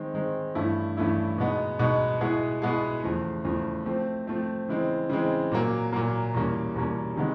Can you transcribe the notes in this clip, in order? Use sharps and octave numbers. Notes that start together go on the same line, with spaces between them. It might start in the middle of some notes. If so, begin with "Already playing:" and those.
Already playing: D#3 G#3 C4
D#3 G#3 C4
G2 E3 A3 C#4 E4
G2 E3 A3 C#4 E4
B2 G#3 B3 D#4
B2 G#3 B3 D#4
B2 G#3 B3 E4 G#4
B2 G#3 B3 E4 G#4
E2 C#3 F3 A3
E2 C#3 F3 A3
F3 A3 C4
F3 A3 C4
C#3 E3 G#3 C4
C#3 E3 G#3 C4
A#2 F#3 A#3
A#2 F#3 A#3
E2 B2 G3 A#3 C#4
E2 B2 G3 A#3 C#4
C3 D#3 G#3 B3